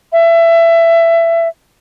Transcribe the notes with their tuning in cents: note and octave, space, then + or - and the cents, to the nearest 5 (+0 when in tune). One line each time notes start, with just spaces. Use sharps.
E5 +20